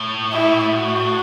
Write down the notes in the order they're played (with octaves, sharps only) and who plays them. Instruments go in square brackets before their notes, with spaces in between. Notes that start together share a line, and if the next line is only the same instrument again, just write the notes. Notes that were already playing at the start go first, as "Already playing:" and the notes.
Already playing: [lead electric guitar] A2
[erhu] E4
F#4